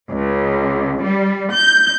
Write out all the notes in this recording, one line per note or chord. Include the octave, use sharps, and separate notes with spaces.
C#2
G3
G6